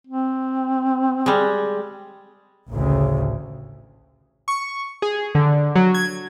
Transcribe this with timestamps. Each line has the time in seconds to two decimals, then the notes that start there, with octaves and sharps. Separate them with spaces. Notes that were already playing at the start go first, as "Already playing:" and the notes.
0.07 C4
1.26 G3 G#3
2.69 A1 D2 A2 C#3
4.48 C#6
5.02 G#4
5.35 D3
5.75 F#3
5.94 G#6